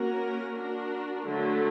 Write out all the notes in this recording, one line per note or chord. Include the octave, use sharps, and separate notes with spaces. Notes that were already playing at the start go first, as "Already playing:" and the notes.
Already playing: A#3 C#4 F#4 A#4
D4 F#4 A#4
D3 F#3 A3